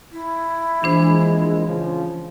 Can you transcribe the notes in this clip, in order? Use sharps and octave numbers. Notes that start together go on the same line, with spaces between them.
E4
A#1 E3 G#3 D4 C5
C#3 F3